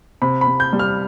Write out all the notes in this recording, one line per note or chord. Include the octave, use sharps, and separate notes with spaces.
C3 B5
B5
C3
G6
G3
F6